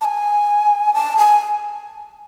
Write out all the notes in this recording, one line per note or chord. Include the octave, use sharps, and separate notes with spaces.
A5
G#5
A5
G#5